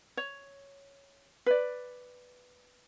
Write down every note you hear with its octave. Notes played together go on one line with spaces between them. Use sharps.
C#5
B4 D5